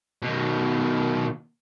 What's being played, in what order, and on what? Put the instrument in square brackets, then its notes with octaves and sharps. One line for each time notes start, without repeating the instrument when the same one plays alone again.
[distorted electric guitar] B2 D#3